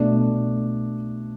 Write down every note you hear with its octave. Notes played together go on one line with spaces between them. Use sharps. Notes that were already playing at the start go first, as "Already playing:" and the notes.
Already playing: B2 A3 D4